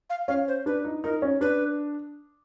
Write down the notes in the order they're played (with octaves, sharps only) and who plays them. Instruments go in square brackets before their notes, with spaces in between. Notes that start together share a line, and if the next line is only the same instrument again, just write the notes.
[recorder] F5
[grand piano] C#4 [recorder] F5
[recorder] C5
[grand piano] D4 [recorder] B4
[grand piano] D#4
[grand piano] D#4 [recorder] A#4
[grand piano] C#4
[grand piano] D4 [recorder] B4